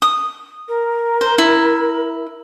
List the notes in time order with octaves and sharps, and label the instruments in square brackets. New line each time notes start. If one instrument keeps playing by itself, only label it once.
[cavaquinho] D#6
[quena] A#4
[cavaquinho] C5
E4